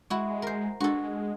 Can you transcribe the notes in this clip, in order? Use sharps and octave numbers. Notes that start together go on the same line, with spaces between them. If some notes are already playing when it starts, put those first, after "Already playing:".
G#3 E4 F#4
A#4 C5
G#3 D4 F#4 A4